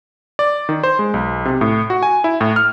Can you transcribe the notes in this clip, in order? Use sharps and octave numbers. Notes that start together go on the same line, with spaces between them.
D5
D#3
C5
G#3
B1
C3
A2
F#4
G#5
E4
A2
F6